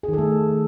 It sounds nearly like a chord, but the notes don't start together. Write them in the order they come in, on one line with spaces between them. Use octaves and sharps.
G#4 D#3 A4 A3